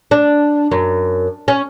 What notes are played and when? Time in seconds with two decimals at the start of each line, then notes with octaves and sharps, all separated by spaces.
0.11 D4
0.71 F#2
1.48 C#4